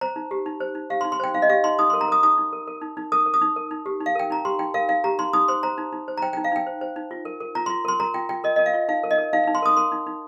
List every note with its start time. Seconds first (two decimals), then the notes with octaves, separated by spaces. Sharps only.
0.01 C5 A#5
0.16 D#4
0.31 G4
0.46 D#4
0.60 C5
0.75 D#4
0.90 G4 F5
1.01 C6
1.04 D#4
1.12 C6
1.20 C5 G5
1.34 D#4 F5
1.42 D#5
1.49 G4 F5
1.64 D#4 C6
1.79 D#4 D#6
1.90 C6
1.94 A#4
2.01 A#5
2.08 A#4 D#6
2.23 D#4 D#6
2.38 D#4
2.53 A#4
2.67 A#4
2.82 D#4
2.97 D#4
3.12 A#4 D#6
3.26 A#4
3.34 D#6
3.41 D#4
3.56 A#4
3.71 D#4
3.86 G4
4.01 D#4
4.06 F5
4.15 A#4 G5
4.30 D#4 A#5
4.45 G4 C6
4.59 D#4 G5
4.74 A#4 F5
4.89 D#4 F5
5.04 G4 A#5
5.19 D#4 C6
5.33 D#4 D#6
5.48 C5 C6
5.63 C5 A#5
5.78 D#4
5.92 D#4
6.08 C5
6.17 A#5
6.22 C5 G5
6.33 G5
6.37 D#4
6.44 F5
6.52 D#4 G5
6.66 C5
6.81 C5
6.96 D#4
7.11 F4
7.25 A#4
7.40 A#4
7.55 F4 A#5
7.66 C6
7.70 F4
7.85 A#4 C6
8.00 A#4 A#5
8.14 F4 G5
8.29 F4 G5
8.44 A#4 D#5
8.56 A#4 D#5
8.66 F5
8.74 F4
8.89 D#4 F5
9.04 A#4
9.11 D#5
9.18 A#4
9.33 D#4 F5
9.44 F5
9.48 D#4
9.55 C6
9.62 A#4 D#6
9.77 A#4 C6
9.92 D#4
10.07 D#4